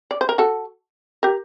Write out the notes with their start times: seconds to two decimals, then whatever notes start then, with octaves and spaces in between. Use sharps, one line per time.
0.11 D5
0.21 C5
0.29 A#4
0.38 F#4 A4
1.23 G4 A#4